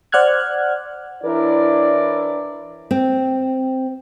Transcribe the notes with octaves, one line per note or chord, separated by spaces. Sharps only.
C5 D5 F#5 F6 F#6 G#6
E3 D4 E4 A#4 C#5 D5
C4